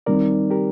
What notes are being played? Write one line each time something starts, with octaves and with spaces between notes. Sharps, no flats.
D#3 G3 C4 D#4 A#4 D5
G4 A#4